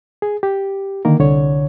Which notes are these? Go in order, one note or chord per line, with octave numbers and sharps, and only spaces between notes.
G#4
G4
D3 D#3 A#3 A#4
C2 D3 C#5